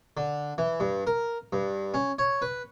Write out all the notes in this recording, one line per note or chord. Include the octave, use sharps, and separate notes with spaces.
D3
E3
G2
A#4
G2
C#4
C#5
B4